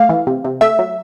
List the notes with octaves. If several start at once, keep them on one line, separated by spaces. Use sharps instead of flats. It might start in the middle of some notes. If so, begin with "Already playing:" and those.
Already playing: A3 F5
E3
C3
C3
A3 E5
F#3